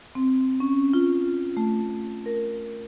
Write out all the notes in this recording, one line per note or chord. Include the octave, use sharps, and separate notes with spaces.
C4
C#4
F4
A3
A#4